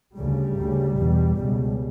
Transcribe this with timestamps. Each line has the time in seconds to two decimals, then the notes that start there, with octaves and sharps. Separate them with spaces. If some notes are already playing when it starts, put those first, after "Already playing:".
0.17 D2 C#3 G3
0.58 D2 C#3
0.98 E2 B2
1.37 C#2 B2